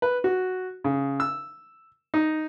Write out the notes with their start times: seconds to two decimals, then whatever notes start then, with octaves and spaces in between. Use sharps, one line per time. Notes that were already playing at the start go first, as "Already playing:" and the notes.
0.02 B4
0.24 F#4
0.84 C#3
1.20 E6
2.14 D#4